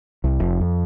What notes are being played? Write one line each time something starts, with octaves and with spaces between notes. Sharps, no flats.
C2
F1
F2